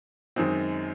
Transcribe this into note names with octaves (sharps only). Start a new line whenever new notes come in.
F#2 D#3 G#3 C4 D#4